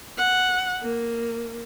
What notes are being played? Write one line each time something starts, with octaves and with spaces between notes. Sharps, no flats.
F#5
A#3